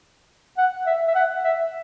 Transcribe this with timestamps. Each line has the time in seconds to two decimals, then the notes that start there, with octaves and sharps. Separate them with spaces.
0.58 F#5
0.86 E5
1.07 E5
1.15 F#5
1.44 E5